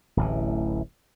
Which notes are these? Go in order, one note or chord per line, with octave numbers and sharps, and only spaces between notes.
D1 A1 E3